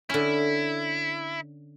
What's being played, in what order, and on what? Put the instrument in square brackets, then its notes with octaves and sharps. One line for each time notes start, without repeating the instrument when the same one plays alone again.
[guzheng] D3 C#4 [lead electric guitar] E4